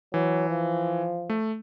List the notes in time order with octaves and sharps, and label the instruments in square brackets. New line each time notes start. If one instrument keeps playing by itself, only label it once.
[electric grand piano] E3 [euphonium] F#3
[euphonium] F3
[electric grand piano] A3